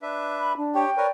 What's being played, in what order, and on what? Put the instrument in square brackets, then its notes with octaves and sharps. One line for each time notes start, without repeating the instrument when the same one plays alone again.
[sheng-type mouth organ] D4 B4 E5
[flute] B5
D4
[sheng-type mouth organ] G4 C#5 [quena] G5
[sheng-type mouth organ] A#4 B4 C#5 [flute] D5